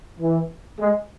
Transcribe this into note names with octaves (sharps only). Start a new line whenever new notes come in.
E3
G#3